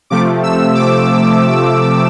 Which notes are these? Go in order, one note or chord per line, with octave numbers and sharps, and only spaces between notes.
C3 F3 A3 D6
E6
D6